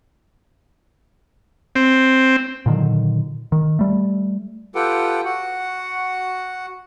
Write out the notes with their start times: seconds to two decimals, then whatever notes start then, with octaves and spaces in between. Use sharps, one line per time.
1.76 C4
2.66 A#2 D3 D#3 F#3
3.52 D#3
3.79 G3 A3
4.75 F4 G4 A4 B4 F#5 G5
5.25 F#4 F#5